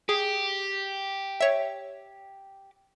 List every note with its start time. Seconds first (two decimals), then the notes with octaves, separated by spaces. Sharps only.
0.09 G4 G#4
1.41 C#5 E5